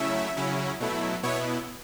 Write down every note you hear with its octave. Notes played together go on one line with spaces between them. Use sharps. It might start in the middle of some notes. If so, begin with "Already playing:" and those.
Already playing: C#3 F#3 A3 C#4 E4 E5
C#3 F#3 C#4 E4
B2 F#3 A3 E4
B2 B3 E4 C#5